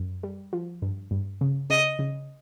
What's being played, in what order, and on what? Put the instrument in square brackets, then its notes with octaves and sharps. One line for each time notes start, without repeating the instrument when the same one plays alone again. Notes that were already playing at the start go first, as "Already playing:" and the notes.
Already playing: [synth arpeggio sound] F#2
G3
F3
G2
G2
C#3
[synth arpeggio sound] C#3 [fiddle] D#5
[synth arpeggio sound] C#3